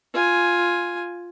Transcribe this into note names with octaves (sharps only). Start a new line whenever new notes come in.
F4 G#5